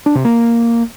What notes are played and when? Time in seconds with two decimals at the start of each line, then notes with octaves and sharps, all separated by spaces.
0.06 D4
0.15 C3
0.25 A#3